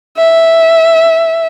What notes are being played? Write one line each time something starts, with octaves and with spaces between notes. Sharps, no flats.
E5